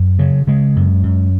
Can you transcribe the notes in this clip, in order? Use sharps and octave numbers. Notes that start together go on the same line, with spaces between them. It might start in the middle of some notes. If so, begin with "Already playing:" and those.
Already playing: F#2
C#3 F#3
C#3 G#3
F#2
F#2